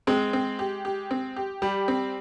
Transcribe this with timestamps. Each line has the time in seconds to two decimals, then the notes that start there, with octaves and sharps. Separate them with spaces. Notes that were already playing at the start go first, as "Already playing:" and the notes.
0.07 G#3 C4
0.33 C4
0.59 G4
0.85 G4
1.11 C4
1.36 G4
1.62 G3 G4
1.88 C4